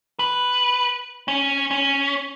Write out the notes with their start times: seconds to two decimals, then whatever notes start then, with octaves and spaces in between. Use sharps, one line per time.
0.19 B4
1.28 C#4
1.71 C#4